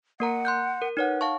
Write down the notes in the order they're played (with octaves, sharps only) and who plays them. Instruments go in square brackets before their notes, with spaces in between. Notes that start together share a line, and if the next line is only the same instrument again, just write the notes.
[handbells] A#3 A#4 A#5 [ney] F#5
[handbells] C6 F#6 G6
A#4
[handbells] D#4 C#5 F#5 [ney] B4
[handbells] F5 A5 C#6